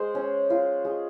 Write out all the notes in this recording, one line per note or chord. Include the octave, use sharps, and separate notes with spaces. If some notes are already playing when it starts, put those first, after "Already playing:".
Already playing: G#3 C5
C#4
F4
G#3